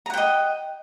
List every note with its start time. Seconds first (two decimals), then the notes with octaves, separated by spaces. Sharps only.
0.06 A#5
0.10 F#5
0.14 G5
0.17 D#5